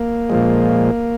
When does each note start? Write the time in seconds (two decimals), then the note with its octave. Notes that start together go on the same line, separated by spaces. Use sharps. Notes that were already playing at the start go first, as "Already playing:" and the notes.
Already playing: A#3
0.30 A#2 F3 G#3